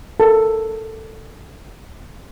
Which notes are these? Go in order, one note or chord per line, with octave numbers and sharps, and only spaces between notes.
A4 A#4